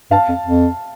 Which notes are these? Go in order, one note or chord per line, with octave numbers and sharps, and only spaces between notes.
G2 F5 A5
F2
F2